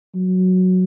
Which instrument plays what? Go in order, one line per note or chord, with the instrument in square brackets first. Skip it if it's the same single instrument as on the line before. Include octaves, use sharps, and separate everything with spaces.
[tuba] F#3